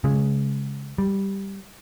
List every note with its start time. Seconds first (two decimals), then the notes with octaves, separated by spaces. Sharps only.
0.04 C#3 G#3
0.98 G3